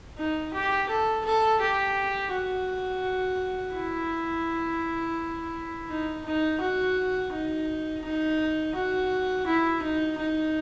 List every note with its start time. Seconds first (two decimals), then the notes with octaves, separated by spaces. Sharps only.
0.18 D#4
0.53 G4
0.89 A4
1.25 A4
1.61 G4
2.32 F#4
3.75 E4
5.89 D#4
6.25 D#4
6.61 F#4
7.32 D#4
8.04 D#4
8.75 F#4
9.46 E4
9.82 D#4
10.18 D#4